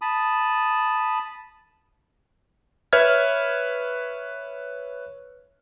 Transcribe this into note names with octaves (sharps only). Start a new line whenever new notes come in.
A5 B5 D#6
B4 C#5 E5 F6 G#6